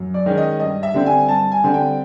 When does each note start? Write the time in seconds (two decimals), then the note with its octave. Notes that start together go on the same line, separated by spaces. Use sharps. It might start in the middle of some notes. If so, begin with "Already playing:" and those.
Already playing: F#2
0.14 D5
0.26 D#3 G#3 C#4
0.37 D#5
0.60 G2 D#5
0.83 E5
0.94 D3 G3 C4
1.06 G#5
1.29 G2 A5
1.52 G#5
1.64 D3 G3 C4
1.74 G5